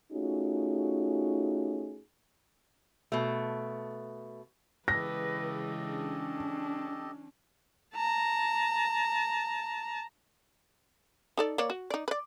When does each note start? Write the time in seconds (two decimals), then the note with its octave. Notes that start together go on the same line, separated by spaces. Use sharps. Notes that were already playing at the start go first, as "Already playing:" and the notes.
0.12 A3 C#4 D#4 F4 F#4 G#4
3.12 B2 A3
4.88 C#3 E3 G#3 G4 A4 B4 D#5 A#6
5.85 C#4 D4
7.95 A5 A#5
11.37 D#4 A4 D5
11.58 A#3 C#5 D5
11.70 F#4
11.90 D#4 D5
12.08 B4 D5